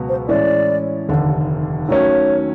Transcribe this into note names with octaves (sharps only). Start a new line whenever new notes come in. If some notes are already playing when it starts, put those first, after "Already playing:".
Already playing: C#2 B2 F#3 B3
C5
A2 E3 G#3 C#4 E4 D5
F1 D#2 D3
D#2 D#3 F#3 A3 C#4 C#5